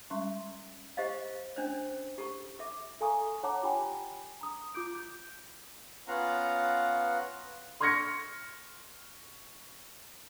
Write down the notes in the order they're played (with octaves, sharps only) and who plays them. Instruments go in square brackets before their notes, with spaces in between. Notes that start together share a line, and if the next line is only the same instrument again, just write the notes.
[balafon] G3 G#3 C#4 E5 C6 C#6
[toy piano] G4 C5 D#5 F5
C#4 D4 C5
G4 A4 C#6
A4 E5 D6
[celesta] A4 F5 G#5 A#5 C#6 D#6
C#5 F#5 A5 A#5 D6
F4 G4 G5 G#5 B5
A#5 D#6
F4 D6 G6 D7
G6
[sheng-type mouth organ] B3 C#4 F4 F5 F#5 A#5
[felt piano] C6 C#6 F6 G#6 A#6 C#7